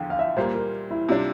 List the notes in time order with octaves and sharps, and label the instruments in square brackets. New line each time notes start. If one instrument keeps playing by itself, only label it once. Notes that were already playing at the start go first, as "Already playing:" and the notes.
Already playing: [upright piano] E2 D3 F3 [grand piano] F5 G5
[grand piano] F5
E5
[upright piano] A#2 G3 A#3 [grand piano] C5
[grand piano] A#4
E4
[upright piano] C3 G3 D4 [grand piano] F4